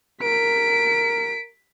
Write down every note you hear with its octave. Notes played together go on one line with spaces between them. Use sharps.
A#4 B6 D7